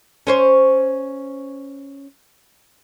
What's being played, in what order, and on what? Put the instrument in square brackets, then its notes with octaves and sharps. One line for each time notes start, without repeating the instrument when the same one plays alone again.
[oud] C#4 C5 C#5